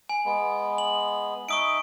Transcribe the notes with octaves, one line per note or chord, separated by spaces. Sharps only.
G#5
G#3 B3
F#7
D#4 E5 C#6 D#6 D7